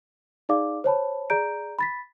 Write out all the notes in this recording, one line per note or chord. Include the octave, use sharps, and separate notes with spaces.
D#4 G#4 D5 F5 D6
C5 C#5 A5 B5
G#4 D5 A#5 G6 D7
B5 A6 B6